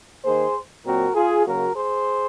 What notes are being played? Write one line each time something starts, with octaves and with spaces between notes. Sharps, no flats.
D#3 A#3 G#4 C5
A#2 F#3 C4 F#4 A#4
F4 G#4
C#3 F#3 A#3 F#4 A#4
G#4 C5